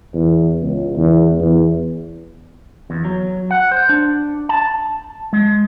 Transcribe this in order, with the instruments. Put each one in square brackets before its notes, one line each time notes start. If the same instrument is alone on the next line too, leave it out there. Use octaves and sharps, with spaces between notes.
[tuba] E2
C#2
E2
E2
[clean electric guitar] E2
F#3
F#5
C5
D4
A5
G#3